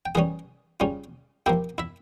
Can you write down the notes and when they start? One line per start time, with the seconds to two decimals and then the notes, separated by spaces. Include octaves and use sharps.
0.06 G5
0.15 E3 G3 C#4 G#4 G#5
0.80 C#3 G3 C#4 F4
1.46 F3 A#3 E4 G4 G5
1.78 E4 E5